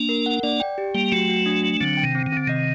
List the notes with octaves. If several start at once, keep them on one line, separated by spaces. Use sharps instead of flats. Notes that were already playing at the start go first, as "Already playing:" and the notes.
Already playing: A#3 D4
A#4
F#5
A#3 D4 D5
G5
G4
G3 A#3 G5
F#3 A3 F#4
F#4
D4
D4
D3 F#3 C4
G5
C3 D#3
C4
D#3
D3 C4
C3 D#3 D#5